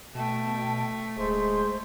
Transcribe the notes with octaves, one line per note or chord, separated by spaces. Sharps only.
B2 A3 G5 A5
D1 G#3 C5 C6